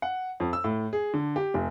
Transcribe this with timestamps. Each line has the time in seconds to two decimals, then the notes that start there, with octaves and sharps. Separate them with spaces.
0.02 F#5
0.40 F2
0.53 E6
0.64 A2
0.93 G#4
1.14 D3
1.36 G4
1.54 F1